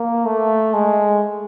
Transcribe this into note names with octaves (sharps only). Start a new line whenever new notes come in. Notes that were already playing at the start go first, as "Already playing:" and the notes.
Already playing: A#3
A3
G#3